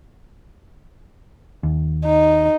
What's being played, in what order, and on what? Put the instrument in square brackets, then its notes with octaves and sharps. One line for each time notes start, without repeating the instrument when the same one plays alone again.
[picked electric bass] D#2
[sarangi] D#4